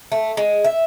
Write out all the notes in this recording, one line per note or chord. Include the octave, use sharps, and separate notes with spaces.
A3
G#3
E5